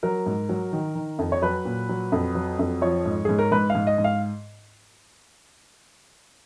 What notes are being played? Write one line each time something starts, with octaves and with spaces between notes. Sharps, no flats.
F#3 A#4
G#2
F#3
D#3
D#3
F2
C#5
F#3 B4
A#2
F#3
F2
F#3
F2
F3 C#5
G#2
G#2 G#4
A#4
G#2 B4
F5
G#2
D#5
G#2
F5